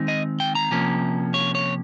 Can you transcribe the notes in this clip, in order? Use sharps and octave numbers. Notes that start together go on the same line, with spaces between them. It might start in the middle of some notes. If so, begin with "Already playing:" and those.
Already playing: D#3 G#3 C4 D#4
D#5
G5
A#5
C3 F3 A#3 C#4
C#5
C#5